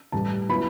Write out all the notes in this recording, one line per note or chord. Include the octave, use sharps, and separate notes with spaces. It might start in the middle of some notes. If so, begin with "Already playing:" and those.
A2 E3 G3 A5
F#3 B3 E4 B5